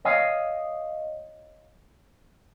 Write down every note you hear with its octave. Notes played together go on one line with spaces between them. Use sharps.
C#5 D#5 F5